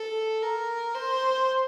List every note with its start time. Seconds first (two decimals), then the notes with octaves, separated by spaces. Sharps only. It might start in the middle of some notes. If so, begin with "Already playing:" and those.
Already playing: A4
0.42 A#4
0.94 C5